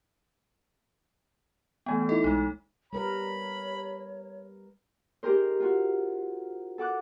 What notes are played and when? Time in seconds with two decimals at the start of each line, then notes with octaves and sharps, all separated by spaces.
1.86 E3 A3 B3 G5 G#5
2.09 D#4 E4 A4
2.24 B1 G#3 D#4
2.93 G3 A#4 B4 C#5 B5
5.23 D#4 G4 G#4 A#4 C5
5.60 F4 F#4
6.78 A4 F#5 D6 F#6